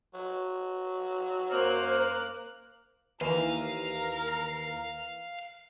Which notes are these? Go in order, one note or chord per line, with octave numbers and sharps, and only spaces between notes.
F#3
F#2 A#3 C5 D6 F6 F#6
D#2 E3 A#4 F5 D#7 E7